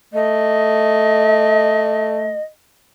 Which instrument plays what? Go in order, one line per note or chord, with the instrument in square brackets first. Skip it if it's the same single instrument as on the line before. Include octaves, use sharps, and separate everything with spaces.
[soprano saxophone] A3 [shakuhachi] D#5